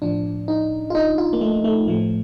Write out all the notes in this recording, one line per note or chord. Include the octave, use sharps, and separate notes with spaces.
A2 F3 D4
D#4
F4
D#4
F4
A#3
A3
A3
A2 F3 A3